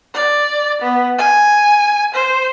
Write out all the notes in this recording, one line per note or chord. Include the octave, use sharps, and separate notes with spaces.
D5
B3
G#5
C5